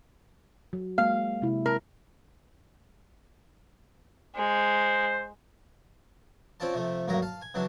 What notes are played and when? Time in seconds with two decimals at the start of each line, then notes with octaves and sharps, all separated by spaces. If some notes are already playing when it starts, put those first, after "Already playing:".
0.73 F#3
0.98 G#3 A#3 F5
1.42 C3 G#3 E4
1.66 A#4
4.36 G#3 C5
6.60 C4 C#4 F4 D5 A5
6.74 C3 F3 A3
7.08 D2 G2 F#3 A#3 A#5
7.22 F5 A5
7.42 G#5
7.54 C#3 E3 F#3 D4